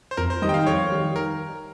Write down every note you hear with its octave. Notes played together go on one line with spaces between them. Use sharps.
C5
F2 A#4
C5
D#3 G3 D#5
G5
F5
F2 C#5
D#3 G3
A#4